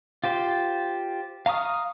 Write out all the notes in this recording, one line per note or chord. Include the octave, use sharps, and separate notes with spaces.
F4 G4 C5
F5 A#5 C#6 D#6 F6